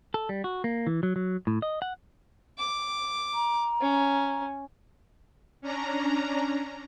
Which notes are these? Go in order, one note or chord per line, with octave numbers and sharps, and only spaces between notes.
A4
G3
F#4
A#3
E3
F#3
F#3
A2
D#5
F#5
D6
A#5
C#4
C#4 D4 A#5